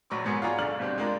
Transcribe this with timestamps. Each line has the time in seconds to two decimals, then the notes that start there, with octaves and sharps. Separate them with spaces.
0.10 A#1 F#3 B5 C#6 D6
0.25 G#2 F#3 B3 G#4 A#4 C#7
0.42 F4 F#4 G#4 D5 A#5 C#6
0.58 B1 D3 D5 F6 F#7
0.79 G1 B2 C4 D4 G4
0.98 G#3 A#3 D4 F4 A#4